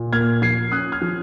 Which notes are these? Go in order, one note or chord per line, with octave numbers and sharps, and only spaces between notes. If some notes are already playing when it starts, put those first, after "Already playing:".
Already playing: A#2
A#3 F6 G#6
F3 G#6 C7
C#4 D#6 F#6
F6 G#6
F3